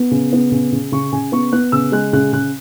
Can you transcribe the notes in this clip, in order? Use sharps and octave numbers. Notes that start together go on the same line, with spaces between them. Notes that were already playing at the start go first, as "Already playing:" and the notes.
Already playing: B3
C#3
B3
C#3
C#3
C#3 C#6
C#3 G#5
B3 C#6
B3 F#6
C#3 E6
G#3 F#6
C#3 F#6
C#3 F#6